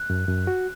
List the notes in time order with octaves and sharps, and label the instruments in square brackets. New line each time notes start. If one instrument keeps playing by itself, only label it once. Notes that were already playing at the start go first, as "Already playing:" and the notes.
Already playing: [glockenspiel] F#6
[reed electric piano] F#2
F#2
F#4